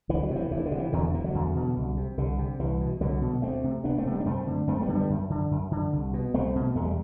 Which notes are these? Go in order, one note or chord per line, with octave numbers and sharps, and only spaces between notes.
D2 E3
F#3
C3 E3
D2 E3
D3
C3
E3
E2 D3 F#3
D3
B2 E3
D3 F#3
E2
B2
C2
C3
C2 D3
C3
C2 E3
B2
C2 D3 F#3
B2
D2 A3 C4
C3
D2 B3 D4
A3 C4
C3
G3 B3
D4
F#2 A3 C4
D3
F#2 A3 C4
G3 B3
D3
G3 B3
F#2
D3
F#2
D3
C2
B2
C2 A3 C4
B2
E2 A3
G3